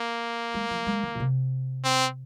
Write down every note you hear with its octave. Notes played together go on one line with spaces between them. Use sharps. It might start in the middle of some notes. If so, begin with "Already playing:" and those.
Already playing: A#3
G#3
F3
G#3
D#3
A#2
C3
C4